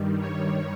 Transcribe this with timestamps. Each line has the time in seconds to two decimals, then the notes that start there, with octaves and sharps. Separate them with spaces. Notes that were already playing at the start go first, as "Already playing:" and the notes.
Already playing: G2 D#3 G3
0.19 C#5